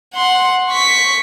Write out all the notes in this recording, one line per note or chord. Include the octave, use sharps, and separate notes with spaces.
F#5 C6
C#6 B6